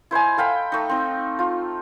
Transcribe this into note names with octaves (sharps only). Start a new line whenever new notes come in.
E4 C5 D#5 G#5
A4 F5 G5 B5
A3 D#4
C4 D#4
F4